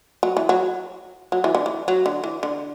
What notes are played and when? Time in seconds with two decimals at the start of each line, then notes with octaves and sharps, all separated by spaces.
0.23 F#3
0.37 E3
0.49 F#3
1.32 F#3
1.44 E3
1.55 D3
1.66 E3
1.88 F#3
2.06 D3
2.24 E3
2.43 D3